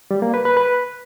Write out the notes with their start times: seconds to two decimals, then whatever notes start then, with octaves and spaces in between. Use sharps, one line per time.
0.11 G3
0.22 A#3
0.34 B4
0.45 B4
0.57 B4